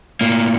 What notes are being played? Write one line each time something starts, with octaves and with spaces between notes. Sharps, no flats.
A2 A#3